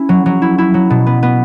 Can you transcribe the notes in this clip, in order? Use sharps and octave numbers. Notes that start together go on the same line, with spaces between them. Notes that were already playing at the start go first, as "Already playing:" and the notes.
Already playing: C#4 E4
F#3
F#3
E4
E4
F#3
B2
B3
B3